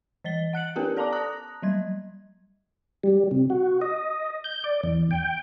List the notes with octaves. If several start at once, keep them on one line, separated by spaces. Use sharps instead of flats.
E3 D#5 A6 G7
F#5 F#6 C#7 F#7
B3 C#4 G4 A#4 B4
A4 D5 A5 A#5 D6
A5 A#5 D#6 F#6 A#6
F#3 G3 G#6
G3
C3
F#4
D#5
G6
D5
E2
G5